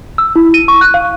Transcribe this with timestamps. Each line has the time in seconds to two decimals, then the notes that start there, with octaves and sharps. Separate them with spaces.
0.18 E6
0.36 E4
0.54 D#7
0.68 C#6
0.81 F#6
0.94 F5